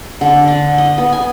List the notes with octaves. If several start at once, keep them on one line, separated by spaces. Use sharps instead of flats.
D3
D4
D#5
B3
G#5